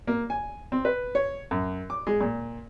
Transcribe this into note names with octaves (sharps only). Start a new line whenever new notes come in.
A#3
G#5
C4
B4
C#5
F#2
D6
G#3
A#2